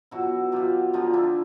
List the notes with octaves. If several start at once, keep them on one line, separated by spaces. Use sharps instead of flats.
B2 F#3 E4 F#4
B2 F#3 F4 G4
D3 F3 G#3 D#4 F4
D4 E4